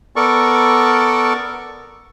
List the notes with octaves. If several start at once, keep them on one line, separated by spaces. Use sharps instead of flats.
B3 A4 A#4 D5 C#6